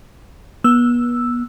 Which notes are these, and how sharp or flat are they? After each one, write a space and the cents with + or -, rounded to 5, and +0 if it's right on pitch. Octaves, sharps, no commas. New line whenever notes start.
B3 -35 E6 +0